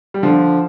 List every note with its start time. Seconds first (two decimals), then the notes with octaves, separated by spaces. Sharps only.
0.14 G3
0.23 D3 F3